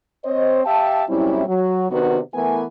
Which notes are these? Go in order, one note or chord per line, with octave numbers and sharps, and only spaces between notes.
C4 C5 C#5 D#5
G4 E5 F5 G5 A5
A#2 F#3 G3 C4 C#4 E4
F#3
C3 D#3 B3 D4 F#4 B4
E3 A3 B3 E4 A#4 G#5